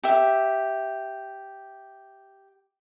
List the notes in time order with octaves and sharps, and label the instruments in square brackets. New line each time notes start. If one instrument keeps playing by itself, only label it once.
[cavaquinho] G4 E5